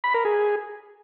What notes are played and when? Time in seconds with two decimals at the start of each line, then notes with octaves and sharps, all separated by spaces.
0.04 B5
0.14 A#4
0.25 G#4